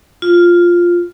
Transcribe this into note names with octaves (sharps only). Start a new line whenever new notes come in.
F4